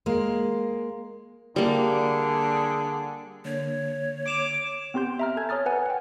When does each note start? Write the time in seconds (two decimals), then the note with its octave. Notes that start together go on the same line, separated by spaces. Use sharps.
0.06 G#3 A#3
1.56 D3 G3 A#3 G#4
3.45 D3 A#3 C#5
4.26 D6 D7 E7 F7
4.94 B3 C4 G4 C6 G6
5.19 E5 A#5 F6
5.37 A4 G#5 A5 G6 G#6
5.49 C#5 A#5 D#6 F6 A6
5.66 B4 F#5 G#5
5.86 F#5 G5